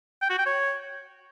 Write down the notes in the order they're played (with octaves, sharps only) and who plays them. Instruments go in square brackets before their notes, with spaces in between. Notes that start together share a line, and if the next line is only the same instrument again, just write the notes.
[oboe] G5
F#4
G5
C#5